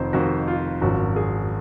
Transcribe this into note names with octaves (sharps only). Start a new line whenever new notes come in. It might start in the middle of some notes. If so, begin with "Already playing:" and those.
Already playing: F1 F2 D#3 C5
F1 F2 D#3 F#4
F4
G#1 F#2 F3 F#4
G#4